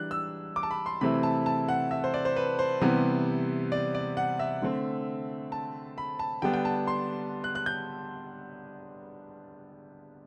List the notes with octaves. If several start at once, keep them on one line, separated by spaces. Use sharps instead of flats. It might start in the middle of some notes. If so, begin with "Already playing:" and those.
Already playing: E3 G3 D4 F#6
E6
D6
A5
B5
C6
C3 E3 A3 C4 E4 B5
A5
A5
F#5
E5
C5
D5
C5
B4
C5
C3 E3 G3 B3
D5
D5
F#5
E5
D3 A3 C4
A5
B5
A5
D3 G3 B3 D4 G5
G5
A5
C6
F#6
F#6
G6